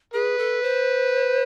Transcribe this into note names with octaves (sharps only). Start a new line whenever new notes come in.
G#4 B4
A4
C5